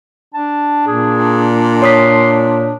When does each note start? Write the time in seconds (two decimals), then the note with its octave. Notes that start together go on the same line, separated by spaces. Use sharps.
0.34 D4 A5
0.87 A#2 G#4
1.82 C#5 C6 D#6 B6